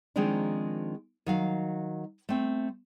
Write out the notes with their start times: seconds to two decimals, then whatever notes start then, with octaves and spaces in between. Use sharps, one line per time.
0.16 D#3 F3 G#3 A#3 C4 D4
1.26 D#3 F#3 F5
2.29 A3 C4